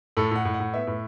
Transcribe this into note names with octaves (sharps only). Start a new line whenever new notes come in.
A2 A4
A2 F#5
A2
F#5
A2
B3 E5
A2